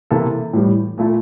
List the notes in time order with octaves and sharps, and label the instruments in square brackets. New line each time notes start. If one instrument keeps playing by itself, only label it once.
[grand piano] C3 E3 A#3 E4 A4
A2 E3 G3
A#2 A3 E4 A4